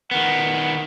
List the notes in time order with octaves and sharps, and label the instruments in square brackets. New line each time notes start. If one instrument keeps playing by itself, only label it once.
[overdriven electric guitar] D#3 B3 [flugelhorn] F#5